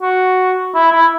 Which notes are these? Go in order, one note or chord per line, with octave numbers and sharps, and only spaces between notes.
F#4
E4
E4